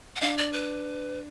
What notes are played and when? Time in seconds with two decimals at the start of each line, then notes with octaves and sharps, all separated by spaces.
0.16 F#5
0.21 D4 F5
0.38 D5
0.53 B4